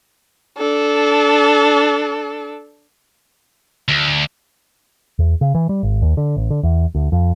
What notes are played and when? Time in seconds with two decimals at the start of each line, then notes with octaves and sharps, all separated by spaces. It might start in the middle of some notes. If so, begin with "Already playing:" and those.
0.58 D4 A4
3.88 D2
5.19 E2
5.41 C#3
5.55 E3
5.69 G3
5.83 G#1
6.02 D#2
6.17 D3
6.37 A1
6.50 D3
6.63 E2
6.95 D2
7.12 F2